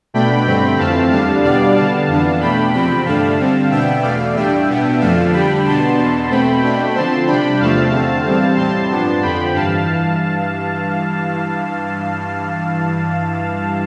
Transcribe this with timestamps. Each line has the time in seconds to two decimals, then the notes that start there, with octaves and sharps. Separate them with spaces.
0.14 B2 A3 D4 G5 B5
0.46 G2 D3 A3 C4
0.78 F2 E3 A3 C4 F5 A5
1.11 E2 D3 G3 D4 F5 A5
1.43 B2 G3 B3 D4 D5 F5
1.76 D3 G3 B3 F5 A5
2.08 F2 E3 B3 D4
2.41 B2 A3 D4 G5 B5
2.73 E2 C3 F3 C4 G5 B5
3.05 G2 D3 A3 D4 F5 A5
3.38 D3 G3 C4
3.70 B2 B3 D4 E5 G5
4.03 E2 B2 A3 D5 F5
4.35 A2 G3 D4 E5 G5
4.68 B2 B3 D4
5.00 F2 D3 F3 A3 D4 F5 A5
5.32 D3 G3 D4 G5 B5
5.65 B2 B3 D4 A5 C6
5.97 E2 B2 B3
6.30 B2 A3 C4 G5 B5
6.63 B2 A3 D4
6.94 D3 F3 C4 A5 C6
7.27 C3 G3 D4 G5 B5
7.59 E2 C3 F3 A3 F5 A5
7.92 D3 A3 C4
8.25 E2 C3 G3 C4
8.57 A2 G3 C4 A5 C6
8.90 G2 F3 B3 D4
9.22 F2 D3 F3 G5 B5
9.54 G2 E3 F5 A5